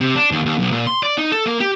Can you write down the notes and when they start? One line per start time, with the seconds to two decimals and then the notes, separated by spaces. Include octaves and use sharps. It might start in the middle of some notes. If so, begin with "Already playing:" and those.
0.01 C3
0.15 D4
0.31 D#2
0.46 D#2
0.59 B1
0.72 A#2
0.87 C6
1.03 D5
1.18 D#4
1.32 A4
1.46 A#3
1.60 G4